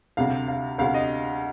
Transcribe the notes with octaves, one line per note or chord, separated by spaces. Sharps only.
D2 C3 G3 F5
F5
D2 C3 G3 F5
D#5